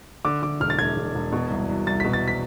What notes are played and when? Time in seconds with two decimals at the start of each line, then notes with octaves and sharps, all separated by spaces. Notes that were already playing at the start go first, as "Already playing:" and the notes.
0.25 D3 D6
0.42 D3 D6
0.60 E1 F6
0.70 A6
0.78 E1 G#6
0.97 E1
1.15 E1
1.32 B2
1.50 C2
1.69 C2
1.87 C2 A6
2.00 B2 B6
2.13 A6
2.28 B6